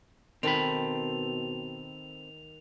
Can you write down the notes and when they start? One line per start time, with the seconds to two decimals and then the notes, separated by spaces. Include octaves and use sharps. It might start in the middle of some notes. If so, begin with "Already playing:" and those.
0.43 B2 D#3 C4 A4 B5 F7